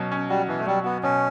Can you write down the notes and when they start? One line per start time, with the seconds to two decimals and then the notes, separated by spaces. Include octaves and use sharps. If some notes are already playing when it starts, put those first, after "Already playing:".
Already playing: B2 F#3 C#4
0.12 C#4
0.30 G3 F#4
0.48 B2 E3
0.59 A3
0.66 F#3 G3
0.84 B3 F#4
1.03 B2 C#4